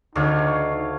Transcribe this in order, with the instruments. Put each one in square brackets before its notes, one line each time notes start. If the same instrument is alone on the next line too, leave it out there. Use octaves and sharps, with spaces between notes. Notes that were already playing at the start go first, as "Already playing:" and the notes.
[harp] D2 [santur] D4 C#5 F5 [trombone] D#4